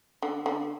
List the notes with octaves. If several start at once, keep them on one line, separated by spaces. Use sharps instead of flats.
D3
D3